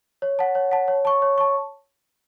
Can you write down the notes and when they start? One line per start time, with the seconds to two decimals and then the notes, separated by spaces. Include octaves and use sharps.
0.22 C#5
0.39 F#5 A5
0.55 C#5
0.71 F#5 A5
0.88 C#5
1.05 A5 C#6
1.22 C#5
1.38 A5 C#6